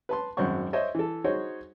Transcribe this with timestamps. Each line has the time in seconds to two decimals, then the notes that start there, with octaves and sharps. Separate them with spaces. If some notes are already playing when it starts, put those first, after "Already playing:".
0.09 B4 A5 C6
0.37 G#1 F#2 C5 F#5 C#6
0.73 C5 C#5 D#5 E5
0.95 E3 A4
1.24 D#4 F#4 G#4 C5 C#5